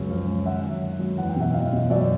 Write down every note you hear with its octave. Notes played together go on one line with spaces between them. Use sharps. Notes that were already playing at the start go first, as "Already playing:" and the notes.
Already playing: C#2 F#2 C#3
F3
C#2
D#3 E5 F#5
F#2
D#3
F#2
E2 F#5
G5
B2 E5 F#5
E2 D#5 F5
B2
F#2 D5 E5